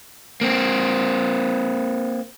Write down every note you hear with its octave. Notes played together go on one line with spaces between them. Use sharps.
A#3 C4